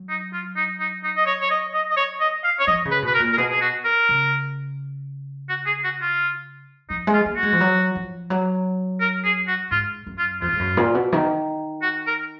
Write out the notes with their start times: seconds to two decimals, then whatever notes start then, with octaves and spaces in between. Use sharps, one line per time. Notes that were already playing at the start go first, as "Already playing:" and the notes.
Already playing: F#3
0.09 D#4
0.33 F4
0.56 D#4
0.80 D#4
1.04 D#4
1.17 D#5
1.27 C#5
1.41 C#5
1.50 D#5
1.74 D#5
1.91 D#5
1.97 C#5
2.20 D#5
2.44 F5
2.60 C#5
2.67 F3 D#5
2.85 C#3
2.91 B4
3.02 B2 B4
3.15 A#4
3.20 A#2
3.33 A#4
3.38 B2 G#4
3.51 G#4
3.61 F#4
3.85 A#4
4.09 C#3
5.49 F#4
5.66 G#4
5.84 F#4
6.02 F4
6.90 F3 D#4
7.07 G#3
7.14 F4
7.26 A#3
7.37 F#4
7.43 G#3
7.53 F3
7.61 F#3
7.95 F3
8.30 F#3
9.01 A#4
9.25 G#4
9.48 F#4
9.71 G#2 F4
10.07 F#2
10.19 F4
10.42 F2 F4
10.53 G#2
10.59 F#2
10.77 A#2
10.95 B2
11.13 D#3
11.82 F#4
12.07 A#4